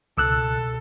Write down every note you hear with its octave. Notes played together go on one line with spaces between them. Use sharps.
C#2 B2 A4 E6 F#6